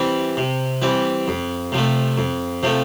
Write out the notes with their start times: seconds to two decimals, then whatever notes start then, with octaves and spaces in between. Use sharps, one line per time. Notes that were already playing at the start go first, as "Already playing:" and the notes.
Already playing: E3 G3 C4
0.37 C3
0.82 E3 G3 C4
1.28 F2
1.72 C3 F3 A3
2.18 F2
2.63 C3 F3 A3